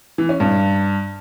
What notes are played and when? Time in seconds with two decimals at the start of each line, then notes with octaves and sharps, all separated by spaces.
0.18 E3
0.29 C#4
0.40 G2